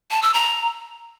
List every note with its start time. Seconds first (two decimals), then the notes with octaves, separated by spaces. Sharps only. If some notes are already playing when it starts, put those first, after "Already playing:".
0.11 A5
0.22 E6
0.34 A#5